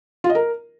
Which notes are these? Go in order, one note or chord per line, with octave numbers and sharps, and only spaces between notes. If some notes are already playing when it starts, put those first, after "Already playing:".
F4
D#5
A#4